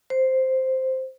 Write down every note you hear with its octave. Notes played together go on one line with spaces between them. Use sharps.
C5